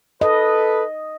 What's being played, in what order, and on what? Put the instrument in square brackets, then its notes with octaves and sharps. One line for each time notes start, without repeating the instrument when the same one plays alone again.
[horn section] A4 B4 [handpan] D#5